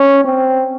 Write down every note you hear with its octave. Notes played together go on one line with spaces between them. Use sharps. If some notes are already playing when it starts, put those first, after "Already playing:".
Already playing: C#4
C4